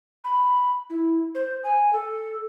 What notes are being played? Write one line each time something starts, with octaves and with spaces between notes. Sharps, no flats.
B5
E4
C5
G#5
A4